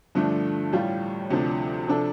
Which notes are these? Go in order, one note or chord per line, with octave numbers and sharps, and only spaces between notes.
G2 D3 F3 A3 D4
A1 A2 G3 F4
D2 C3 F3 D4
C3 F3 D4 A4